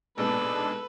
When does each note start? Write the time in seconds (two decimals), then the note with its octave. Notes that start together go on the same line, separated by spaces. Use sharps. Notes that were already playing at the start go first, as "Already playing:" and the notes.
0.18 A#1 G#2 B2 G#3 D4 A4 B4